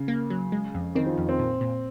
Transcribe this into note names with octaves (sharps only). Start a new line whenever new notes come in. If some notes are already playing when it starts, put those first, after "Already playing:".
Already playing: C#3
A#3
F#3
G#3
F2
D#3 C4
F3
F2
C4
A#2
A#2